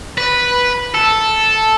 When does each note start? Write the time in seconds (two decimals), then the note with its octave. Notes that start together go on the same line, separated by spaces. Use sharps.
0.18 B4
0.95 A4